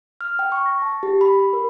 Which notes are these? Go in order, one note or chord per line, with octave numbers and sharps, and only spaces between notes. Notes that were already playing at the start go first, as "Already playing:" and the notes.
F6
G5
C#6
A#6
A5
G4
B5
B5
A#4